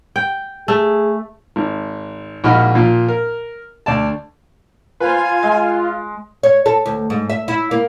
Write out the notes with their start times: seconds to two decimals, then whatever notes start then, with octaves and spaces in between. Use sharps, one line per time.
0.16 G5
0.68 A3 G#4
1.56 G#1
2.44 A#1 G#2 F#4 D#5 B5 F6
2.75 A#2 F3
3.09 A#4
3.86 D2 D5 A5
5.00 F4 B4 C5 G#5
5.43 G#3
6.43 C#5
6.66 A4
6.86 D2
7.10 G#2
7.30 E5
7.48 E4
7.71 A#3